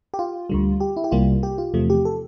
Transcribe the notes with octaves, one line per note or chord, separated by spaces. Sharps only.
G4
F4
D2 D3 G3
G4
E4
G4
C2 C3 G3 A#3 F4
G4
F4
E2 C3 F3 A3
G4
A4